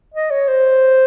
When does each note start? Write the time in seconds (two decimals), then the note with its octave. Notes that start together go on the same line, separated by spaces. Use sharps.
0.14 D#5
0.31 C#5
0.48 C5